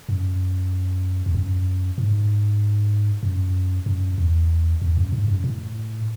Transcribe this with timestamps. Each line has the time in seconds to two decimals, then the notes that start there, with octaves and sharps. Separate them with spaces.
0.09 F#2
1.26 E2
1.34 F#2
1.98 G#2
3.23 F#2
3.86 F#2
4.18 E2
4.82 E2
4.97 F#2
5.12 G#2
5.28 F#2
5.44 A2